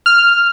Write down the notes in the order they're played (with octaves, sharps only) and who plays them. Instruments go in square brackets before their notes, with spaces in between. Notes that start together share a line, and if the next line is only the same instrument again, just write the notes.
[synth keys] F6